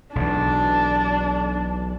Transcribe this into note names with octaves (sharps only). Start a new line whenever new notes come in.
B1 E3 D4